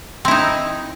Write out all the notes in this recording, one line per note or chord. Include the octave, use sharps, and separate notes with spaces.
C4 D#4 E4